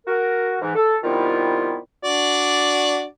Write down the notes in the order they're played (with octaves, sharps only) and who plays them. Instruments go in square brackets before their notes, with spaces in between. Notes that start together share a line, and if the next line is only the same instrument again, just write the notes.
[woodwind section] F#4 A#4
G#2 E3
A4
C3 D#3 G3 B3 E4 F4
[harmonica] D4 F#4 D5